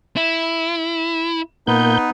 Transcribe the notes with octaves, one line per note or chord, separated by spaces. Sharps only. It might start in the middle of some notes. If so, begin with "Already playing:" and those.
E4
A#2 A#3 B3 D#4 B4 G6